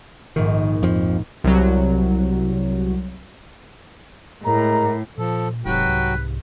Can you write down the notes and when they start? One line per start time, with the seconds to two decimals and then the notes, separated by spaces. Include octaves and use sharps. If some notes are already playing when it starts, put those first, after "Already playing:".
0.36 A#1 G#2 D#3
0.82 F2 F3
1.44 C2 F#3
4.44 A2 G#3 A#4 A#5
5.18 A#2 F3 A4
5.65 D#1 G#2 C3 F#3 F#4 B4 G5
5.88 C2